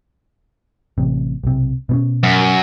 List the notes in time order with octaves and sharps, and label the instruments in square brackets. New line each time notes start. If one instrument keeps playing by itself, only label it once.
[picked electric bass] A1 C3
B1 C3
B2 B3 C#4
[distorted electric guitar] F#2